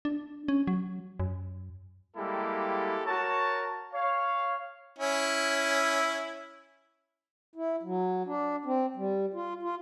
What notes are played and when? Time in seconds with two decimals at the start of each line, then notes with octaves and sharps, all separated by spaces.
0.05 D4
0.48 C#4
0.67 F#3
1.19 F#2
2.16 G3 G#3 A#3 E4 G4 A4
3.06 F#4 A#4 C#5 A5
3.94 C#5 F5
4.99 C#4 E4
7.55 E4
7.83 F#3
8.26 D4
8.65 C4
8.96 G3
9.34 F4
9.62 F4